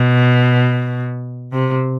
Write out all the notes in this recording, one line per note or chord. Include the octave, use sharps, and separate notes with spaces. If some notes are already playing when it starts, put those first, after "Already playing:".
Already playing: B2
C3